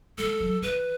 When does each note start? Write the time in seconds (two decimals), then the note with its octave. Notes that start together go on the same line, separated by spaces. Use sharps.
0.18 G#3 A4
0.40 F#3
0.62 E3 B4